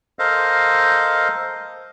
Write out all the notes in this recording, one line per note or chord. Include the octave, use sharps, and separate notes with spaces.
A4 A#4 C5 D#5 F5